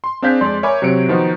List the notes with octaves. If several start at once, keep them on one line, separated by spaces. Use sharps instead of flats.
C6
C4 D4 G#4 F5 G6 B6
F2 G#3 D5 C6
A#4 C#5 E5 G#5 B5 D6
C3 F#3 C#5 C#7 D7
D#3 F3 B3 D#4 F#4